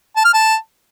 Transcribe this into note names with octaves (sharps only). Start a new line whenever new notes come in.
A5
F6
A5